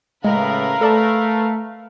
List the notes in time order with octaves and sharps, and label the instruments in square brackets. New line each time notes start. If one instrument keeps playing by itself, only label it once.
[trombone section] A2 C#3 [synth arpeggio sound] G#3 [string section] A#4 B4 [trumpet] F5
[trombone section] A3 [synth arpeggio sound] A4 D5 A5